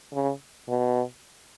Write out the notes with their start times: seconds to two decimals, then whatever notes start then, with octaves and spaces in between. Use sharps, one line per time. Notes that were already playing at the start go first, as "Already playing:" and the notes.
0.14 C#3
0.69 B2